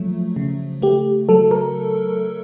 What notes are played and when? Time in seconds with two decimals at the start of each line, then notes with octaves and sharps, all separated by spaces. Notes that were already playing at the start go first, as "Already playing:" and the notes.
Already playing: F3 F#3 A3
0.36 C#3
0.82 A3 G4
1.29 F#3 A4
1.51 A#4